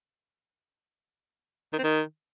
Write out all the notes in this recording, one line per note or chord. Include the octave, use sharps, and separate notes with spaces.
D#3
C4
D#3